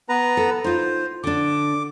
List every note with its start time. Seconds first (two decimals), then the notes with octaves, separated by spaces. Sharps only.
0.09 B3 B4 A#5
0.37 A4
0.64 D#4 F4 C5
1.24 D3 D4 D6